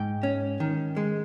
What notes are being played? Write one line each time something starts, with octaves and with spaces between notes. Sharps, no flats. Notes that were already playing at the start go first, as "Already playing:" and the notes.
Already playing: G#2 G5
C#4
D#3
G#3